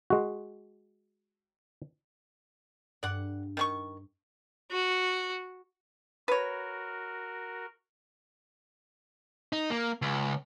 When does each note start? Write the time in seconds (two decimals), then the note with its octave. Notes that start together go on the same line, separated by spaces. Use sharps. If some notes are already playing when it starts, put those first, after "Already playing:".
0.10 G#3 F#4
3.03 G2 D5 F#5
3.57 D#3 G4 C#6
4.71 F#4
6.28 F#4 A#4 B4 C#5
9.53 D#4
9.70 A#3
10.02 C#2